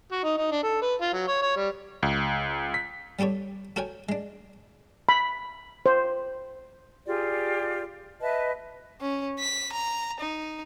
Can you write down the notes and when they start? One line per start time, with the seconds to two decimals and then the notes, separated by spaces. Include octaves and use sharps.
0.12 F#4
0.24 D#4
0.37 D#4
0.51 D4
0.63 A4
0.82 B4
1.01 F4
1.13 F#3
1.28 C#5
1.42 C#5
1.56 G3
2.03 C#2
2.74 B6
3.19 G3 B3 G4 A4 C#5
3.76 F#4 A4 A#4 C#5 G5 G#5
4.09 G#3 D4
5.09 B5
5.86 C5
7.06 F4 G4 G#4 D5
8.21 B4 D#5 E5 A5
9.01 C#4
9.39 B6
9.72 A#5
10.20 D#4